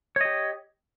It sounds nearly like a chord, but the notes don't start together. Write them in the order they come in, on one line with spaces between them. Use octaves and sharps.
C#5 D#5 G4